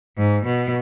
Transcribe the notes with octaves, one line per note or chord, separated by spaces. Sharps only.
G#2
B2